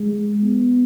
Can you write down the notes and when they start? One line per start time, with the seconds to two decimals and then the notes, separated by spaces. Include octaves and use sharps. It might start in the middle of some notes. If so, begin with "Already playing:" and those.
Already playing: G#3
0.43 B3